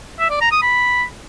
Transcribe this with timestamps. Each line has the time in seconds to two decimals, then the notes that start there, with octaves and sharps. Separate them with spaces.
0.20 E5
0.30 D5
0.41 A#5
0.52 D#6
0.62 B5